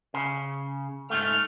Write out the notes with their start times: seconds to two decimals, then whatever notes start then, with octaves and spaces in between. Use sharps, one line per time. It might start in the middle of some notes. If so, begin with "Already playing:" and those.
0.14 C#3
1.10 G#2 A3 F6